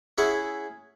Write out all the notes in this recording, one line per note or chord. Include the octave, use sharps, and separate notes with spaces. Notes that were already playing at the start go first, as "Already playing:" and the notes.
C#4 E4 G#4 E5 F#5